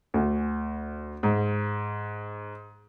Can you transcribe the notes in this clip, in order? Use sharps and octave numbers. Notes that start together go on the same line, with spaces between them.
D2
G#2